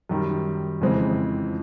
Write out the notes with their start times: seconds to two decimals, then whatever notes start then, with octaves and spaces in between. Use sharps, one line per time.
0.09 F#2 D#3 G3
0.81 F2 C#3 E3 G#3 C4